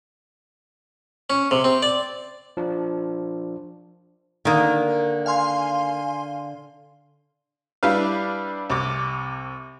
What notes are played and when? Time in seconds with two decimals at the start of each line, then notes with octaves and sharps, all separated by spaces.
1.30 C#4
1.51 C3
1.64 C4
1.82 D5
2.57 F3 D4
4.45 D3 D#3 A#3
5.26 F5 G#5 C6
7.83 G3 D4 E4 B4 F5
8.70 C2 C3 D6